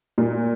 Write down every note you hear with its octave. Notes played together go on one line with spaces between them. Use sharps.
A#2